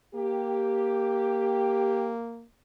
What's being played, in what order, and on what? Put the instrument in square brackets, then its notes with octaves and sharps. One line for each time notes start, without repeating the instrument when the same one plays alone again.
[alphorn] A#3 [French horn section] G4